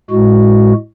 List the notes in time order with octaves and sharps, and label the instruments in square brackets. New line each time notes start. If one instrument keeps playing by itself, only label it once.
[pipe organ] A2 G#3 F#4